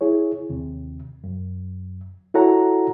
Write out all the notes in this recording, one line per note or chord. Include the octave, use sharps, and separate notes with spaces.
E4 G#4 C#5
D#2 C3
F#2
E4 F#4 A4 C#5 F#5 A#5